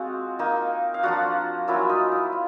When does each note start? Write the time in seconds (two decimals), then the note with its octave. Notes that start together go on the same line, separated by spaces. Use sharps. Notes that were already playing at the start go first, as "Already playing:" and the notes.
Already playing: G#3 C4 F4 F#4 F#5
0.39 A#3 D#4
0.94 F5
1.03 F3 A#3 D4 F4 F#4 F#5
1.67 F#3 A#3 C#4 E4 F4 E5
1.89 D#4 D#5
2.12 E4 E5
2.32 F4